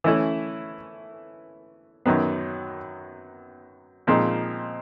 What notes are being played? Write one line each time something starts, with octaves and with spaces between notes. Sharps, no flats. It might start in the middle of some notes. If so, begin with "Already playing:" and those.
E3 A3 C#4 E4
F#2 D#3 F#3 B3
A#2 F3 G#3 C4 D#4